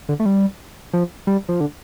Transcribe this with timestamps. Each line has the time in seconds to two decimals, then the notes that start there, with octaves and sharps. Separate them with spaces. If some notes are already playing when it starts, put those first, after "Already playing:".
0.09 D3
0.20 A3
0.26 G3
0.93 F3
1.27 G3
1.49 F3
1.60 D3